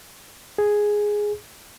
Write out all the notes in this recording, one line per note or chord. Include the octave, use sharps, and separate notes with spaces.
G#4